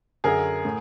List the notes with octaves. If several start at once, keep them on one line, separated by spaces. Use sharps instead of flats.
F#2 D3 G#4 A#4
A2